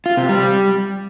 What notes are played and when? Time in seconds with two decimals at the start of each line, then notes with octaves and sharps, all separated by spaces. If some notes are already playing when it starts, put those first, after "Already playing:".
0.06 F4
0.17 C3
0.29 G3